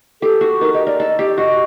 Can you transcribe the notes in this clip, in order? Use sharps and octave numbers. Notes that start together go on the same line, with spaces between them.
G4 A4
F#4
D#4 A#4
G4 D#5
A#4 D5
A4 D#5
G4
F#4 D#5